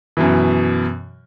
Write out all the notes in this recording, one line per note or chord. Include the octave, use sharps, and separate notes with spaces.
F#2 B2 E3